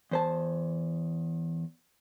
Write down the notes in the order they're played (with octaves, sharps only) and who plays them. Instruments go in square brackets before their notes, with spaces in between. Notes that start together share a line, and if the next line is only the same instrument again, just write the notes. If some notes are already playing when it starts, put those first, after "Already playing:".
[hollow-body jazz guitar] E2 C5 A5